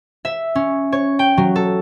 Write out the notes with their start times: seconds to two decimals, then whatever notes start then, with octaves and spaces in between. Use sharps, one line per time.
0.25 E5
0.55 C#4
0.92 C#5
1.19 G5
1.37 F#3
1.56 A4